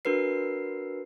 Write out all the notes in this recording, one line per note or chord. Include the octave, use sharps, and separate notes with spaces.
D4 F#4 A#4 B4 C7